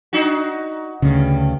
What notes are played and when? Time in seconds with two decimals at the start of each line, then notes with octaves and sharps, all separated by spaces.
0.13 D4 D#4 F#4
1.02 D2 G2 C#3